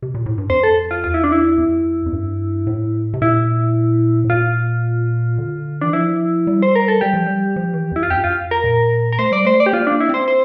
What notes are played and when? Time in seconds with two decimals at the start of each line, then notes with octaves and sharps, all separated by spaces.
0.02 C3
0.14 A#2
0.26 A2
0.38 G2
0.50 F2 C5
0.63 A4
0.91 F4
1.04 E2 F4
1.14 E4
1.24 D4
1.32 E4
1.58 F2
2.06 F2
2.13 G2
2.67 A2
3.14 C3
3.22 A#2 E4
4.24 A2
4.30 A#2 F4
5.38 D3
5.81 E3 D4
5.93 F3 E4
6.47 G3
6.62 C5
6.75 A#4
6.88 A4
7.01 G3 G4
7.14 F3
7.26 G3
7.56 F3
7.73 E3
7.92 F2 E4
8.03 F4
8.10 F2 G4
8.17 G2
8.24 F2 F4
8.51 A#4
8.64 A#2
9.12 A#4
9.19 A3 C5
9.32 G3 D5
9.45 A3 C5
9.60 D5
9.66 G4
9.73 A#3 F4
9.87 A#3 D4
10.00 E4
10.09 C4 C5
10.28 C5